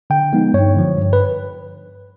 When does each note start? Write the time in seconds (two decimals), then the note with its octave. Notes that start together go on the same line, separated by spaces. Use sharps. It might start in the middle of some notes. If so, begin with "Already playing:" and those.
0.10 D3 G5
0.33 F3 G#3 B3 D#4
0.54 G2 C#5
0.76 D3 F3
0.98 G2
1.13 B4